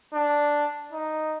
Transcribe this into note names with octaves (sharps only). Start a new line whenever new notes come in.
D4
D#4